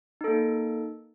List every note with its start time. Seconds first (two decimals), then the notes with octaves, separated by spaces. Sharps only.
0.21 D#4
0.24 A4
0.28 A#3